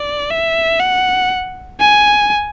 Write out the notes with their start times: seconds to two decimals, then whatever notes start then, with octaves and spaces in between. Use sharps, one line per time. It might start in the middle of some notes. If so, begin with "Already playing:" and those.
Already playing: D5
0.30 E5
0.80 F#5
1.80 G#5